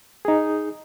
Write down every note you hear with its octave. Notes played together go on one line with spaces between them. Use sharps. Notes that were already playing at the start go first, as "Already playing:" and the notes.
D#4 G#4